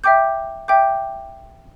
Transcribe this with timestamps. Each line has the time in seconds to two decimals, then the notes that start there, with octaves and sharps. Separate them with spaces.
0.04 E5 G5 D6 G6
0.68 E5 G5 D6 G6